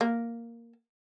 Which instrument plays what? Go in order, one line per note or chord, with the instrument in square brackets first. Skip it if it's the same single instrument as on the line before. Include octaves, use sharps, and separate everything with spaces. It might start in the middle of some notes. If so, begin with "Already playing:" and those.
[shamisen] A#3